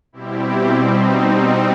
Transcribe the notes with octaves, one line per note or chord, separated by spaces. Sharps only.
B2 G3 C4 E4 G4
B2 G3 C4 D#4